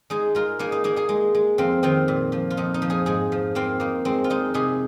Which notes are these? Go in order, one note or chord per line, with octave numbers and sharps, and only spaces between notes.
G#3 D#4 G#4
G#3 F4 A#4
A#3 D#4 G#4
D#4
A#3 D#4 G#4
D#4 G#4
G#3
G#3
F2 C4 F4
D#3 C4 F4
A#2
F3
F4
F2 D#4
D#4
F3
D#4 G#4
G#2 D#4 G#4
F3
A#3 C4 F4
A#3 D#4
G#3 C4
F4
G#3 D#4
C3 D#4 G#4